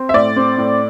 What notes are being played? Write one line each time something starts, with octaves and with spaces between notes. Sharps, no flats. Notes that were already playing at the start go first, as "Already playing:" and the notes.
Already playing: C4
E5
A2 D5
C4
A2